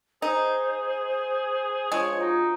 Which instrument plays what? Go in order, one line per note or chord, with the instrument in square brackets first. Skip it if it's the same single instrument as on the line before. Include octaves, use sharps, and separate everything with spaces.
[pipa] D#4 [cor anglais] G#4 [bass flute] C5
[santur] F3 D4 F4 [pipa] G#3 [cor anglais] C#5
[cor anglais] D#4 [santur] F#4 A#5 D6